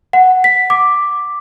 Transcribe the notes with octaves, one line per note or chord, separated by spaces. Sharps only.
F#5
B6
D6